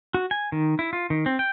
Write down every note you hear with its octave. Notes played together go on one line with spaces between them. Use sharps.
F#4
G#5
D#3
E4
F4
D#3
C4
G5